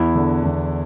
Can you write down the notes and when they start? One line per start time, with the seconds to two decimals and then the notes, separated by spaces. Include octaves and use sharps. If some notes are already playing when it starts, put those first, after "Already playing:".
Already playing: E2 E4
0.15 D3
0.44 E2